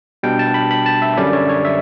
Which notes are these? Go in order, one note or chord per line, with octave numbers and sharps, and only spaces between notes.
B2 G3 D4 G5
A5
B5
B5
A5
E5
F#2 D3 G3 C#4 D5
C#5
C#5
E5